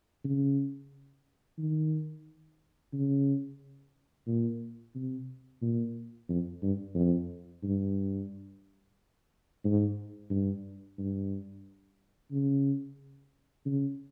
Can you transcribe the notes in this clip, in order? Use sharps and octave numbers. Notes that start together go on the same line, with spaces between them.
C#3
D#3
C#3
A#2
C3
A#2
F2
G2
F2
G2
G#2
G2
G2
C#3
C#3